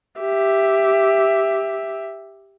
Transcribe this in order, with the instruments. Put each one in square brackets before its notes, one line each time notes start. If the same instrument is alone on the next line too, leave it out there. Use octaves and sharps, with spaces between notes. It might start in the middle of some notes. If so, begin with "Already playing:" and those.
[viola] G4 E5